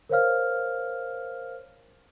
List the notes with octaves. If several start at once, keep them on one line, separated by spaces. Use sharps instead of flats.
A#4 C5 C#5 F5 F6